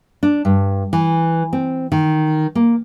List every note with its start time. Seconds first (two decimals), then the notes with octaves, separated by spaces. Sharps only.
0.23 D4
0.45 G2
0.93 E3
1.53 C4
1.92 D#3
2.55 A#3